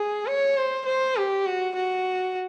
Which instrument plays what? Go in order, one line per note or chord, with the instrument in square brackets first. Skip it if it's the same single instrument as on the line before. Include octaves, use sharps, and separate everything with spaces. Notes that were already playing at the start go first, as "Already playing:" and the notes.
Already playing: [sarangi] G#4
C#5
C5
C5
G4
F#4
F#4